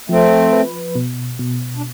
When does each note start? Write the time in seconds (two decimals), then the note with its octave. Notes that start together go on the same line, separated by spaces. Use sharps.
0.09 F3 A3 C4
0.53 B4
0.95 B2
1.39 B2
1.77 D4